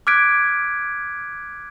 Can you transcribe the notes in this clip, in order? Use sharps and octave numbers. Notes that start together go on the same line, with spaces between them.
D6 F6 F#6 G#6 B6 D7